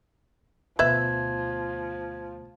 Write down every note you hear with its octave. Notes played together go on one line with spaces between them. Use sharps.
D2 B2 F3 B4 E5 G#6